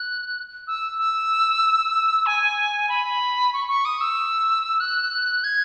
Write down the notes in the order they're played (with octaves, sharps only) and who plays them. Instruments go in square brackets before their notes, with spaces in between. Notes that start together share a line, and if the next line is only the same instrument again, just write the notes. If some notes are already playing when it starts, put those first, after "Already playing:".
Already playing: [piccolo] F#6
E6
E6
G#5
B5
C#6
C#6
D#6
E6
F#6
G#6